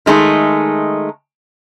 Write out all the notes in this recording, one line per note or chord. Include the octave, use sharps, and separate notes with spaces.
D#3 G#3 A3 D#4